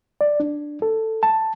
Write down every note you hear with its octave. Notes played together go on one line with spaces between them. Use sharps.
D5
D4
A4
A5